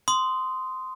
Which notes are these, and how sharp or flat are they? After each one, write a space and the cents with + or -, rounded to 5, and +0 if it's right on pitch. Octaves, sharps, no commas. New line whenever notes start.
C6 -15 D#6 +0